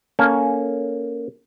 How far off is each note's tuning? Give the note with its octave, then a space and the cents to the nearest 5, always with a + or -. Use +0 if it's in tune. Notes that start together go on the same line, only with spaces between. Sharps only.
A#3 +0 C#4 +10 A4 +0